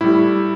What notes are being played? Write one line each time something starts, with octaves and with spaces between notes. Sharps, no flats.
A2 G3 E4